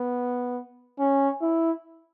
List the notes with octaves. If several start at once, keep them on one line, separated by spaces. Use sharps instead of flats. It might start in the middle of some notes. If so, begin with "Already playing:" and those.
Already playing: B3
C#4
E4